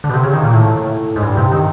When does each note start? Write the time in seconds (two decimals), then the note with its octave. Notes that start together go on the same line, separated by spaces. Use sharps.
0.04 D3
0.09 B2
0.14 C3
0.23 C#3
0.33 D#3
0.43 A#2
0.53 A2
1.16 G#2
1.22 G2
1.37 C3
1.52 D#3